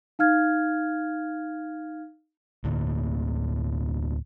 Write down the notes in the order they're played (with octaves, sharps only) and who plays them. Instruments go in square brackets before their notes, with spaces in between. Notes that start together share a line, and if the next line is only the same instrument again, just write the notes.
[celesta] D#4 F5 F6 G#6
[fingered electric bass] D2 A2 D3 A#3